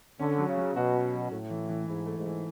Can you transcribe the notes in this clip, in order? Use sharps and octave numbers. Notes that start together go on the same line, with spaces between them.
D3 C#4
F#3
C#3
F#3
B2 F#4
C#4
F#3
A2 A3
E3
E3
G#2 E4
A3
G#2
E3